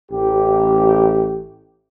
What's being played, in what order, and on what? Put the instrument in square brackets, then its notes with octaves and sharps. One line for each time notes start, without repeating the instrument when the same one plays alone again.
[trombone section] A1 G4